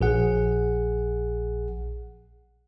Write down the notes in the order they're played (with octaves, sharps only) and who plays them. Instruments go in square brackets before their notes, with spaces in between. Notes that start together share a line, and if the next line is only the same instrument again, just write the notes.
[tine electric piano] A#1 G#4 F#5